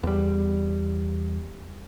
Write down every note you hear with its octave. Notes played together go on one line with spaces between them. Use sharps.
E2 G3